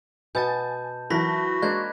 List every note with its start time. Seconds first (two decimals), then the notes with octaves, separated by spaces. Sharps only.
0.35 B2 B3 G#5 A5 G6 A6
1.10 E3 F#3 F#4 A#4 A5 B5 A#6 B6
1.62 G#3 A#3 D4 C5 F#6 G#6